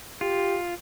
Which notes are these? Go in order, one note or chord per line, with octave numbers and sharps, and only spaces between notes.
F4 G4